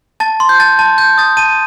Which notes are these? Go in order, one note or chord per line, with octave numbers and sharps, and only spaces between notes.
A5 A6
C6
G6
A5 A6
A5
A5 G6
D#6 A6
A5 D#7